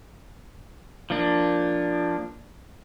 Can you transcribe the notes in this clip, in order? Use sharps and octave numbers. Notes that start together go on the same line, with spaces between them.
F3 A#3 D4